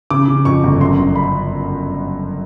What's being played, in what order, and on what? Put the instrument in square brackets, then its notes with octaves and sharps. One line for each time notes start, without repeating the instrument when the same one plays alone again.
[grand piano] C#3 D6
C#3
F2 C#6
G1
F#2 C6
G1
B5